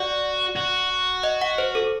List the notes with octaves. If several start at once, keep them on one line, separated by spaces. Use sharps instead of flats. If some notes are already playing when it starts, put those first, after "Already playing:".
Already playing: F#4 D5
F#4
D#5
F#5
C5
A4